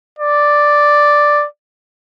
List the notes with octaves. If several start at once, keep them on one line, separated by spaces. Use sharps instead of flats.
D5